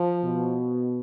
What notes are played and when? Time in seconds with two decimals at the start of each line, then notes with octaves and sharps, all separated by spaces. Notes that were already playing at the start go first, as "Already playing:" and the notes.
Already playing: F3
0.24 B2